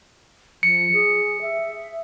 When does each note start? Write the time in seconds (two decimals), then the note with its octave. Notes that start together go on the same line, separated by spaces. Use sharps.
0.63 F3 C#7
0.93 G#4
1.42 E5